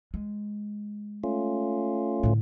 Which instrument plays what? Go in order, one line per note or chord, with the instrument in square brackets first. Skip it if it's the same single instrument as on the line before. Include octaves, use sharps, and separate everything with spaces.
[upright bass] G#3
[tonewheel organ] A3 C#4 F4
[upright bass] A2 D3